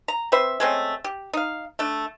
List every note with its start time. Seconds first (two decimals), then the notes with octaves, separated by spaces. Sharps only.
0.08 A#5
0.32 C4 B4 C5 E5
0.60 G#3 A3 C4 C#4
1.04 G4
1.33 D#4 F5
1.79 A3 D4